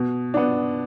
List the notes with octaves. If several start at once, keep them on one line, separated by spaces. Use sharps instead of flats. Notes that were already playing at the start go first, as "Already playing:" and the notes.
Already playing: B2
B3 D4